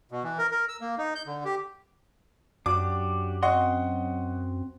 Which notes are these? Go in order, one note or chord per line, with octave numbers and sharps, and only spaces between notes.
B2
E3
A#4
A#4
E6
A#3
D#4
G6
D3
G4
F#2 D4 F#4 G4 D6
C4 D#5 F#5 C6 C#6